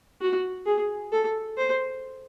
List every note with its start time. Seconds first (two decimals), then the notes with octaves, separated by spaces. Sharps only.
0.21 F#4
0.66 G#4
1.12 A4
1.58 C5